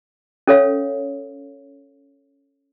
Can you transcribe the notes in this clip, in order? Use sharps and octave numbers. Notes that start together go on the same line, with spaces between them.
C#4 A4 C#5 F5